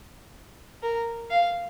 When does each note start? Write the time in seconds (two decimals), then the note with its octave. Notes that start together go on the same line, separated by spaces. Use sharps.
0.83 A#4
1.31 F5